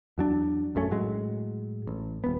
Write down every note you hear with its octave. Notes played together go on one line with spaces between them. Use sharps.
E2 F#3 D4
A#1 F#2 A3 C#4
A2 F#3 G#3
A1
D#1 B3